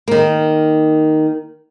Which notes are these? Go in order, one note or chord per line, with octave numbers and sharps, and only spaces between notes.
D#3 A#3